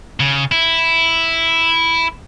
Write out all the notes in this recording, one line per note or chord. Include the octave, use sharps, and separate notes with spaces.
C#3
E4